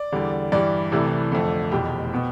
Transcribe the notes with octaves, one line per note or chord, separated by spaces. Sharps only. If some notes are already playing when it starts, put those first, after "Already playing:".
Already playing: D5
E2 D3 G3
G2 E3 G3 D5
C2 C3 E3 A3
F2 D3 A3
F1 E2 B2 G4
B2 B3